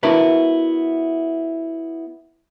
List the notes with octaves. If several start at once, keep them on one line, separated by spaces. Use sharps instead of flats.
B3 D4 E4 F#4 A#4 B4